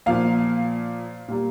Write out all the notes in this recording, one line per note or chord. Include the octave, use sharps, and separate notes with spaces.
A#2 F3 A#3 F5
A#2 G3 A#3